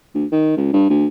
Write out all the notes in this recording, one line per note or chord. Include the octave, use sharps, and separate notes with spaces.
D2
D#3
C#2
G2
D2